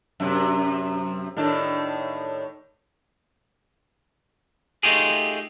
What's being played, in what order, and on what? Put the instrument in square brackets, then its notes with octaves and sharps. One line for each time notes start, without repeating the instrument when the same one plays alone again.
[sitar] F#2 C3
A2 D#3 D4
[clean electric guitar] A3 D#4 F4 G4 G#4